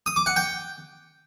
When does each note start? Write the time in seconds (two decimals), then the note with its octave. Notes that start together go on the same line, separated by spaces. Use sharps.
0.06 D#6
0.16 D6
0.26 F#5
0.36 G5